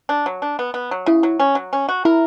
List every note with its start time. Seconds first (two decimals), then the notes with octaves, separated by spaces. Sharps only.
0.09 D4
0.26 F#3
0.42 D4
0.59 B3
0.74 B3
0.91 F#3
1.06 C#3 E4
1.23 F#3
1.40 C#4
1.55 F#3
1.73 C#4
1.89 F#4
2.05 E4 A#4